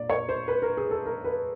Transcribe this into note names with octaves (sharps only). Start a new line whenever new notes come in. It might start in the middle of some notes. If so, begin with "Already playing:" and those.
Already playing: A#2 A#3 D5
C#5
C5
B4
A#4
G#4
A4
A#4
B4